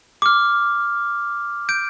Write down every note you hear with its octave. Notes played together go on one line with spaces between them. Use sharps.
D6 F6
G6 D7